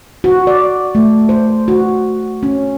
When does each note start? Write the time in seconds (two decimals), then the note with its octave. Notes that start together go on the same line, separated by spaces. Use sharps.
0.24 F#4
0.47 D5
0.95 A3
1.29 C5
1.68 F#4
2.43 C#4